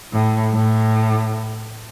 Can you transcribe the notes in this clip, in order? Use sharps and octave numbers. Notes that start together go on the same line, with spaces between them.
A2
A2